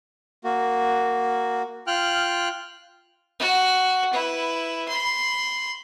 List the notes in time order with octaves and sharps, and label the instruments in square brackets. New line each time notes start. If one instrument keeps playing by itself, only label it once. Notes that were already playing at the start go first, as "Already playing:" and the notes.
[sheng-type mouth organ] A#3 F#4
F4 G5 F6 F#6
[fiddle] F#4
E4 B4
B5 C6